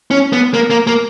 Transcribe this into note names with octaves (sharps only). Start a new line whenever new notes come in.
C#4
B3
A#3
A#3
A#3